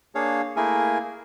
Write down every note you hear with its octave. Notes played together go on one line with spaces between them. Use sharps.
A#3 D4 G#4 C#5 F5
A3 A#3 E4 G#4 A#4 G#5